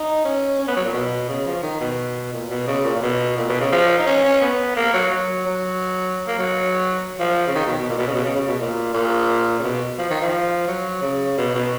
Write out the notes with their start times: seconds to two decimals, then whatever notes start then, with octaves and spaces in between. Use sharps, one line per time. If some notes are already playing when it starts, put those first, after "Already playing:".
Already playing: D#4
0.24 C#4
0.59 C#4
0.68 B3
0.77 F#3
0.85 A#2
0.93 B2
1.29 C#3
1.46 F3
1.63 D#3
1.80 B2
2.33 A#2
2.50 B2
2.67 C#3
2.85 A#2
2.95 A#2
3.02 B2
3.37 A#2
3.49 B2
3.60 C#3
3.72 F3
3.98 D#4
4.06 C#4
4.24 C#4
4.41 B3
4.76 A#3
4.93 F#3
5.11 F#3
5.46 F#3
6.27 A#3
6.38 F#3
7.19 F3
7.47 C#3
7.55 D#3
7.66 B2
7.78 B2
7.89 A#2
7.98 B2
8.07 C#3
8.15 B2
8.24 C#3
8.36 C#3
8.48 B2
8.59 A#2
8.94 A#2
9.59 C#3
9.63 B2
9.98 F3
10.10 D#3
10.21 F3
10.68 F#3
11.02 C#3
11.37 B2
11.55 B2